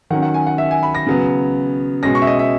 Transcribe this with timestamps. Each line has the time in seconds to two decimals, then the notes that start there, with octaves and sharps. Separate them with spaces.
0.10 D#3 F#3 C#4 F#5
0.23 F#5
0.34 G#5
0.47 F#5
0.58 E5
0.71 G#5
0.83 B5
0.95 A#6
1.07 C#3 F#3 B3
2.03 B2 G#3 C#4 A#6
2.15 C#6
2.22 E5
2.27 D#5
2.39 E5